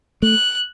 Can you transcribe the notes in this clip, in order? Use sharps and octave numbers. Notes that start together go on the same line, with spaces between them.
A3 F#6